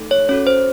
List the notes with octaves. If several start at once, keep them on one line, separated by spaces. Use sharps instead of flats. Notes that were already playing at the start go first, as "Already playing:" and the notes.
Already playing: A3 D#4 A4
C#5
C#4 F#4 A4 C#5
C5